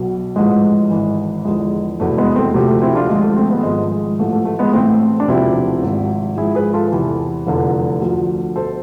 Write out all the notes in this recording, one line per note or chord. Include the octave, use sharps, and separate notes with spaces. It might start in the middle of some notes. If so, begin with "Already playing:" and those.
Already playing: B1 B2
A1 G#2 F3 G#3
G#1 G#2 E3
E2 D3 F3 G#3
F1 E2 B2 A3
G#3 B3
A3 C4
D2 C3 F3 A3
A3
C4 E4
D4 F4
G#1 G#2 F3 G#3
A3
A3 C4
G#3 B3
G#1 G#2 F3 G#3
G#3
A1 A2 F3 A3
A3
A3
G#3 B3
A1 A2 E3 A3 C4
D4
E1 D2 C3 F3 C4 E4
G#1 G#2 F3
G#1 G#2 F3 E4 G#4
G#4 B4
F4 A4
E2 C3 E3
F1 E2 D3 F3
D2 D3 F3
B2 A4 C5